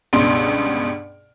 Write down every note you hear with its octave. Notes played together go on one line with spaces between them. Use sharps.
C#2 G2 B2 C6 D7